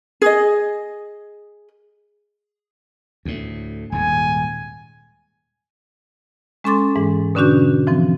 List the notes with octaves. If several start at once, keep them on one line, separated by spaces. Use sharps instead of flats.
G#4 D#5
D2 A2
D#1 G#2 G#5
G#3 C#4 A4 C6 D6 A6
G#2 E3 G#3
B2 D3 C#4 D4 F#4 G6
E3 F3 C4